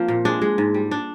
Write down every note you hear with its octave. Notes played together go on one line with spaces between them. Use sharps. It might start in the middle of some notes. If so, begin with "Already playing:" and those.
Already playing: F3 A#3 C4
A#2
G#3 D4
G#3
G#2
G3
D4